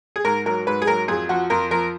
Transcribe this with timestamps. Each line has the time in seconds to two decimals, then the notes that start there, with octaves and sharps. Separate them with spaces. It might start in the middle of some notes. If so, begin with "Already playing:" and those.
0.16 G#4
0.25 G#2 A#4
0.46 F#3 A#4
0.67 G#2 B4
0.82 G#4
0.87 F#3 A#4
1.08 F2 G#4
1.29 F3 F#4
1.50 F2 A#4
1.71 F3 A#4